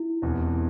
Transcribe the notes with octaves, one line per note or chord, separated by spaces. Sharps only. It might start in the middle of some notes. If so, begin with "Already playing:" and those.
Already playing: E4
E1 E2 C3